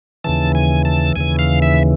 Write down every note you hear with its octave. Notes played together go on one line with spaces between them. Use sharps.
D#2 C#3 E3 A5
G#5
A5
D#2 C#3 E3 G#5
F5
E5